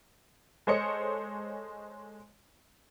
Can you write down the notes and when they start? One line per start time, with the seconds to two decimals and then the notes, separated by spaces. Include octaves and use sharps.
0.67 G#3 A4 C5 C#5 D#5 C#7